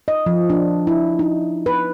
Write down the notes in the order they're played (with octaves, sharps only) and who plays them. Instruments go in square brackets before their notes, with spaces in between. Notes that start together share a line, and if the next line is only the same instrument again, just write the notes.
[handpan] D#5
F3
D4
E4
D#4
B4